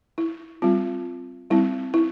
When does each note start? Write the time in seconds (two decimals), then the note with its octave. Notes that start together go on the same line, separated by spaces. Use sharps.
0.18 E4
0.62 G3 C4 F4
1.50 G3 C4 E4
1.94 E4